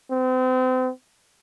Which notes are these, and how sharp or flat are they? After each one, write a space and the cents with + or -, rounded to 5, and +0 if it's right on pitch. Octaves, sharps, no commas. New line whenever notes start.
C4 -35